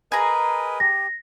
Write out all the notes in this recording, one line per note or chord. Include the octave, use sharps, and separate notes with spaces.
G#4 A#4 B4 D#5 A#5
G4 A#6